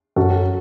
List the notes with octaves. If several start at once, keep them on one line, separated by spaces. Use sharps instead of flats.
F#2 F#4 A4